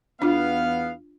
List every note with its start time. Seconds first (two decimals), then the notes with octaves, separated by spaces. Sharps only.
0.22 E2 B3 D4 F4 F5